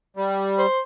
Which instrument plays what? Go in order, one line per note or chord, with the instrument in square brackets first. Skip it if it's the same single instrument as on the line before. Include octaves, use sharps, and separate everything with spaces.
[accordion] G3
[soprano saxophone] C5